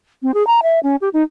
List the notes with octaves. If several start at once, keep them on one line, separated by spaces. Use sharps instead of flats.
C4
G#4
A#5
E5
C#4
G4
D#4